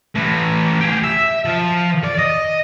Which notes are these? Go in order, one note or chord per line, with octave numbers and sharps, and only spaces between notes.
A2 E3
G4 G#4
E5
F3
D5
D#5